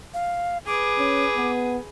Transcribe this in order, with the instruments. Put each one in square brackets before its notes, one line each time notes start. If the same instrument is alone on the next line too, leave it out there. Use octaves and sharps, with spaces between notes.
[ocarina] F5
[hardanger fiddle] G#4 B4 [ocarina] D6
[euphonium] C#4
B3